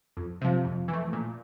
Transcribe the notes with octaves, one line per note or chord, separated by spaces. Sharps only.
F2
C3 F3
F2
E3
A3
A#2